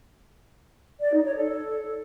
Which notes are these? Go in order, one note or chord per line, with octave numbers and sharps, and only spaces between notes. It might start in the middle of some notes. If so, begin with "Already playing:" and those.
D5
D#4
C#5
A4